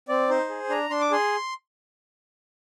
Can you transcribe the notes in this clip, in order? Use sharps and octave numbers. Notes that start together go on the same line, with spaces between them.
C4 D5
D#4 C5
G#4
D4 A#5
D4 C6
D6
G#4 C6